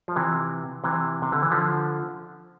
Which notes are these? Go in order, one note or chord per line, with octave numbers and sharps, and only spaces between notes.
F3
C3 E3
C3 E3
C3
D3
E3
D3 F3